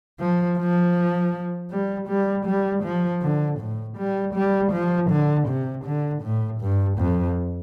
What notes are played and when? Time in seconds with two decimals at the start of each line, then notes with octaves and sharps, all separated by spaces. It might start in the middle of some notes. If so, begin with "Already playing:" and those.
0.20 F3
0.59 F3
1.71 G3
2.09 G3
2.46 G3
2.84 F3
3.22 D3
3.60 A2
3.98 G3
4.34 G3
4.73 F3
5.10 D3
5.48 C3
5.85 D3
6.23 A2
6.61 G2
6.99 F2